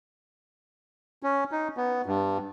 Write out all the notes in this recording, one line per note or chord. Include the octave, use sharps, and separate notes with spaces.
C#4
D#4
B3
G2